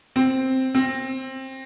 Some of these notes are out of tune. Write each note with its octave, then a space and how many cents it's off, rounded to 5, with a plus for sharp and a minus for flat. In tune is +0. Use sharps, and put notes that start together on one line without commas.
C4 +5
C4 +20